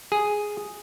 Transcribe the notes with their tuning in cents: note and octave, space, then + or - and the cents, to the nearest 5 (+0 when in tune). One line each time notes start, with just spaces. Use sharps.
G#4 +0